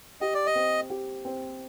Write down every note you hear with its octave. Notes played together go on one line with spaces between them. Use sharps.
G4 D#5
D5
D#5
C4
G4
C4